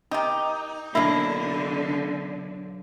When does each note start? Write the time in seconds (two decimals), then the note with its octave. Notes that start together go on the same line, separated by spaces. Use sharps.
0.11 D#3 D#4 G4
0.95 B1 D3 A#3 E4